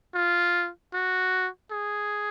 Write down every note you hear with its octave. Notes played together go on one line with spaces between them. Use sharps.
F4
F#4
G#4